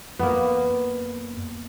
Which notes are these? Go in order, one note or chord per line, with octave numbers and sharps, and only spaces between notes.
F#2 A#3 B3